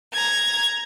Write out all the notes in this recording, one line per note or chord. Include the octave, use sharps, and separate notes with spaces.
A#5 G#6